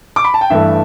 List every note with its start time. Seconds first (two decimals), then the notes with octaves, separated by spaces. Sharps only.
0.16 D6
0.24 B5
0.34 A5
0.41 G5
0.50 G2 E3 A3 E5